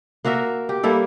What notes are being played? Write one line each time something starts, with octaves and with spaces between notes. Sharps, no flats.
A#3 F#4 A#4 E5
G4
G3 A#3 E4 A4